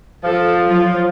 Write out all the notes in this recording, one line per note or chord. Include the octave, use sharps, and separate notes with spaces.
F3 A4
F#3 F4